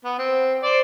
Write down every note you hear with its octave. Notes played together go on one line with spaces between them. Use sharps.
B3
C4
C5 D5